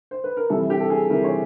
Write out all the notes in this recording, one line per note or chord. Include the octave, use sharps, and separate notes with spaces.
C5
B4
A#4
C3 E3 G3 A4
G4
A4
G#4
C3 E3 G3 A#4
C#5